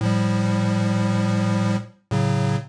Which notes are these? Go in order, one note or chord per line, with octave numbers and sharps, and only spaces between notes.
A2 F3 G3
A2 C#3 F#3